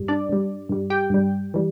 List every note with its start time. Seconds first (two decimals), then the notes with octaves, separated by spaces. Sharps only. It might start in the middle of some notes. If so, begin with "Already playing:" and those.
Already playing: G2 G3
0.08 D4 D5
0.29 G2 G3
0.69 G2 G3
0.90 G4 G5
1.10 G2 G3
1.54 E3 G3